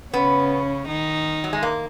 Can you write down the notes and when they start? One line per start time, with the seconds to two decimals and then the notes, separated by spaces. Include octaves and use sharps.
0.14 C#3 B3 C#4
0.88 D#3 D#4
1.44 F#3
1.53 G#3
1.63 A#3